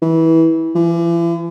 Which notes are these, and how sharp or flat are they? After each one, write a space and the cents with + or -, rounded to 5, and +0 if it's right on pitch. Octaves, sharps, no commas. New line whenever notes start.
E3 -20
E3 +40